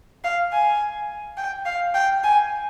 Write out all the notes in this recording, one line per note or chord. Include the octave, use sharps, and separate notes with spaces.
F5
G#5
G5
F5
G5
G#5